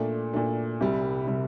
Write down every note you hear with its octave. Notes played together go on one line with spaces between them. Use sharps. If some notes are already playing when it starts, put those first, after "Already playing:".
Already playing: A#2 A3 D4
A#2 A3 D4
C2 C3 G3
C3 G3